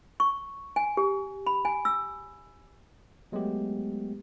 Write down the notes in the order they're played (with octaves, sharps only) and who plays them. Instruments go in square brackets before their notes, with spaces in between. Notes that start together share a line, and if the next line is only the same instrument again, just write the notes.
[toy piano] C#6
G#5
G4
B5
G#5
E6
[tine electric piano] F#3 G#3 A3 B3 G4